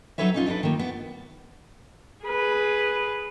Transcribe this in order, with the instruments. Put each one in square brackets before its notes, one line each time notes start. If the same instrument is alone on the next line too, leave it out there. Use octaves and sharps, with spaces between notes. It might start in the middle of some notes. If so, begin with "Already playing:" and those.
[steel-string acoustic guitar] F#3 D#4 A4 B4 C#5 E5
C#4 D#4 F4
D4 D#4 F#4 A4 B4
D#3 A#3
B3
[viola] G#4 B4